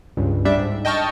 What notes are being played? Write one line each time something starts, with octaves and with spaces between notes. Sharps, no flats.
C#2 G2
G3 D4 E5
G#2
D#5 G5 A5 C#6 F6